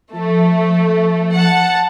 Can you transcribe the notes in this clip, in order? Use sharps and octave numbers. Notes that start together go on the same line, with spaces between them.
F3 A3
F#5 A5